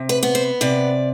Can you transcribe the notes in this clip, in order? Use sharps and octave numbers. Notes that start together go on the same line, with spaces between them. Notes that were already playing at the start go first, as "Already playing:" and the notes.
Already playing: C3
B4
B3
C5
C3 D5